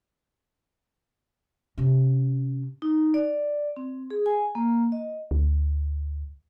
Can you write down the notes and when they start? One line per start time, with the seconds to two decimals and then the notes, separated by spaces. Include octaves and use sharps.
1.78 C3 C#4
2.82 D#4
3.14 D5
3.77 C4
4.10 G#4
4.26 G#5
4.55 A#3
4.92 D#5
5.31 D2